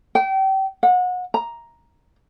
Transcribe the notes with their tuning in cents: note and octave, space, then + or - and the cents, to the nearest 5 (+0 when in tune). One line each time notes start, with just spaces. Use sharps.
G5 -30
F#5 -30
A#5 +5